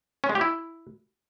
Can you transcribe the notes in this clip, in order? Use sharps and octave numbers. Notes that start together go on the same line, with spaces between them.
C#4
G#3
G4
E4